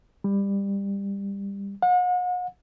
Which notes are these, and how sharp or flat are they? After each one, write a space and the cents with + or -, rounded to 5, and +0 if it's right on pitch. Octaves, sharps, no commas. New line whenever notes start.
G3 +20
F#5 -40